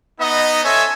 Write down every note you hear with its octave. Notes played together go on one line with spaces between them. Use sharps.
B3 D#4 D#5
C#4 A4 C5 C#5 E5 G#5